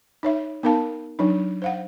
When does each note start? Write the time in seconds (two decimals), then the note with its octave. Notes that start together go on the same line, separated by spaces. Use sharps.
0.23 D#4 C#5 E5
0.63 B3 D#4 A#4 F5 A5
1.19 F#3 D4 D#4
1.62 C5 F5 F#5